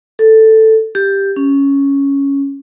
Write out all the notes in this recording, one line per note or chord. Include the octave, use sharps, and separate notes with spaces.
A4
G4
C#4